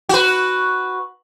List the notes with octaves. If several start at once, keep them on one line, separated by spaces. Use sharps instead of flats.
F#4 B4